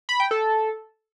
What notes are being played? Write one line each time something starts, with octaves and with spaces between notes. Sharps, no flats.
B5
G5
A4